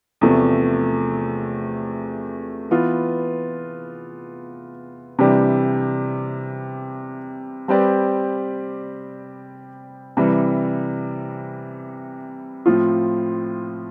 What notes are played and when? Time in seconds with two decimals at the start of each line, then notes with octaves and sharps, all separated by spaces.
0.21 E2 C3 F3 A3
2.71 E3 B3 F4
5.19 C3 E3 G3 D4 G4
7.68 G3 C4 G4 B4 D5
10.17 C3 E3 G3
12.66 A2 F3 C4 F4